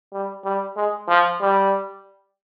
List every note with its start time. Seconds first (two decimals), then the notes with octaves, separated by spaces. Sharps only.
0.13 G3
0.44 G3
0.77 G#3
1.09 F3
1.41 G3